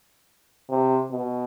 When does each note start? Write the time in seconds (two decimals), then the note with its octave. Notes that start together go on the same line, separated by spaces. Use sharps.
0.70 C3
1.11 B2